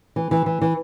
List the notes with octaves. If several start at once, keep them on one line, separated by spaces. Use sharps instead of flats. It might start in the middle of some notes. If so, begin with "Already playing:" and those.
E3
E3
E3
E3